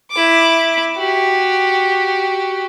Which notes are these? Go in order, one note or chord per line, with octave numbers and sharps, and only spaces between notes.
E4 D6
F#4 G4